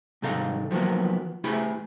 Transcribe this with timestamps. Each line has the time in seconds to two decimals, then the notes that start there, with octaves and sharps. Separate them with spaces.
0.22 C2 G#2 D#3 D#4 A4 F5
0.71 D#3 F3 F#3 A#3 B3
1.44 A3 E4 G4 G#4 B5